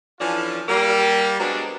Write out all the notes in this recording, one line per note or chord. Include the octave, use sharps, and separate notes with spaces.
E3 F3 C#4 D4 F4 A4
G3 A#3
F#3 G#3 B3 C4 D4